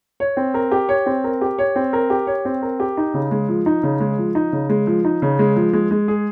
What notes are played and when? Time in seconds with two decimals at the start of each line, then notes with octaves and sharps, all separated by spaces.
0.20 C#5
0.37 C4
0.54 A#4
0.72 G4
0.89 C#5
1.06 C4
1.24 A#4
1.41 G4
1.59 C#5
1.76 C4
1.93 A#4
2.10 G4
2.27 C#5
2.45 C4
2.62 A#4
2.80 G4
2.97 D#4
3.14 C#3
3.31 G#3
3.49 F3
3.66 D#4
3.83 C#3
4.00 G#3
4.18 F3
4.35 D#4
4.52 C#3
4.69 G#3
4.87 F3
5.05 D#4
5.22 C#3
5.39 G#3
5.56 F3
5.73 G#3
5.91 G#3
6.08 G#4